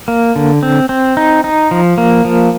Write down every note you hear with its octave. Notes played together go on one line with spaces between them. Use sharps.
A#3
D3
C4
C4
D#4
D#4
F3
A#3
F3